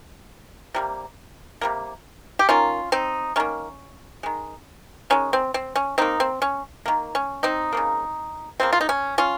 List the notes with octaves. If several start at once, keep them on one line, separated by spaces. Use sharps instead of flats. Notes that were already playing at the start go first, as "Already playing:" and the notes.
C3 G3 A#3
C3 G3 A#3
G4
D#3 A#3 C#4 F4
C4 D#4
D#3 A#3 C#4
D#3 G#3
D#3 G#3 C#4
C4
C4
C#4
D#3 A#3 C4 D#4
C4
C#4
D#3 A#3
C#4
C4 D#4
C#3 F3 A#3
C#3 F3 A#3 C4
F4
D#4
C#4
C#4 F4